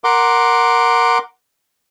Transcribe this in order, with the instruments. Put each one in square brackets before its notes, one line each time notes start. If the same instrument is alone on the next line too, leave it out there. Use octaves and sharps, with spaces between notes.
[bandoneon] A#4 F#5 C6 D6